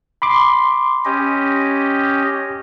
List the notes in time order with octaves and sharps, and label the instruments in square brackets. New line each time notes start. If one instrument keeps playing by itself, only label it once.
[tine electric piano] B5 C6 D6
[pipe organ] C#4 G4 D#5